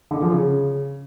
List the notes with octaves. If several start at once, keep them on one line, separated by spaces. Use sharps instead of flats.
D3
F3
C#3